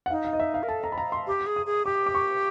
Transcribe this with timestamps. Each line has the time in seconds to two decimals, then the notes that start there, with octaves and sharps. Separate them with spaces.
0.06 F#5
0.10 D#4 F5
0.25 F5
0.33 D#5
0.40 E5
0.54 F5
0.63 A#4
0.68 A4 A5
0.84 A#5
0.92 B5
0.98 A#5
1.12 C6
1.27 G4
1.46 G#4
1.56 D#6
1.66 G#4
1.86 G4 D6
2.06 D6
2.15 C#6